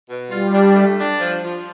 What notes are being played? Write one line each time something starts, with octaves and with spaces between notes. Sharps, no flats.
B2
G3 F4
D4
A3
D4
F3
F3